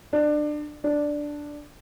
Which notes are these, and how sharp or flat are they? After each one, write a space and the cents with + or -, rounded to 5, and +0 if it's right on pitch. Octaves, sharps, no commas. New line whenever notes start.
D4 +25
D4 +0